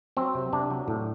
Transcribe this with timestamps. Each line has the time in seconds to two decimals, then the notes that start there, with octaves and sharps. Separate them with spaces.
0.17 F#3 C4
0.35 C3
0.53 C3 D4
0.71 F#3
0.88 A2